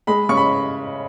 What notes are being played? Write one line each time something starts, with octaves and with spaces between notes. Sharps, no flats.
G#3 B5
C#3 C#6
B5